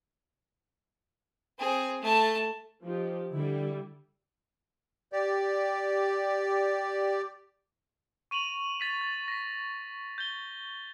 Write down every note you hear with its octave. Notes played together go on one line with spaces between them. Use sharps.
C4 G#4
A3 A5
F3 D#4 G4
D3 G3 E4
G4 D5
C#6 D#7 F7 F#7
A6 B6 D#7
A6
A#6 B6
G6 A6 G7